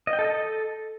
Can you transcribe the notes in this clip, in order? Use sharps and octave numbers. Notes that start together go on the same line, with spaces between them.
D#5
G5
A4
D#5
A4